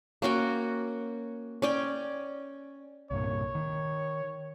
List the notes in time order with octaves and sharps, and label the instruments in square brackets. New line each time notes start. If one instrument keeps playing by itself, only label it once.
[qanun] A#3 C#4 F#4 G5
C#4 D5 G5
[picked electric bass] C2 G2 A#2 [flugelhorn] C#5
[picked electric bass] D#3